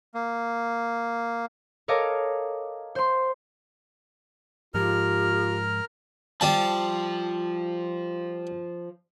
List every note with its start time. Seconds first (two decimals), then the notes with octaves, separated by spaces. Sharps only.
0.14 A#3
1.88 A4 A#4 C#5 D#5 F5 D6
2.95 C5 C6
4.74 G#2 F3 G#3 F4 G4 A#4 F6
6.41 F3 G3 A5